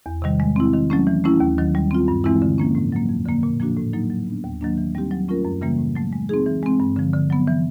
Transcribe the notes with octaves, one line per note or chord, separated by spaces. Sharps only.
E2
C3 D#3 G3
G#3
C4 E4
D#3
F#3 A3 C#4
E3
A3 C#4 E4
D#2
D#3 F#3
G3
C4 F4
G2
E3 G#3 C4 E4
D3
F3 A#3 C#4
A2
F#3 A#3
F2
D3 F3 A#3
A#2
F3 A#3 D4 F#4
A2
F#3 A#3 D#4
F#3
B3 D4
D#2
D#3 F#3 A#3 D4
E3
G3 C4 D#4 G4
F#3
A3 C#4 F4 A#4
F#2
C#3 E3 G3 A#3
A2
F#3 A3
G#3
C4 D#4 G#4
E3
G#3 C4
G2
D3 F3
D3
F#3 B3
E3